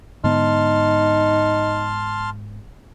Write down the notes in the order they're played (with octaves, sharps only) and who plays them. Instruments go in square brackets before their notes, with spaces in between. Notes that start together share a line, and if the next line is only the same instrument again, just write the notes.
[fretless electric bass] G#2 D3 B3 [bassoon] D#4 [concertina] A5 C6 F6